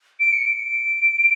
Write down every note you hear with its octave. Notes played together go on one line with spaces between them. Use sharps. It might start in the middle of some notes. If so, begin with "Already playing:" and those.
D7
C#7
D7